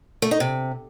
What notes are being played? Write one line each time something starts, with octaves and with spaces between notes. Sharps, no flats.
A3
D#4
C3